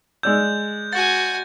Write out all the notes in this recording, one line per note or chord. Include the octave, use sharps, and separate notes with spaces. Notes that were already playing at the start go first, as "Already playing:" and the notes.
G#3 D5 E6 G6
F#4 G#5 A6